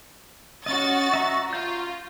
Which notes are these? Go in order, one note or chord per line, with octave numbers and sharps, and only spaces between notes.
C#4 F#4 D#5 A6
E5 A#5 C#6
F4 G6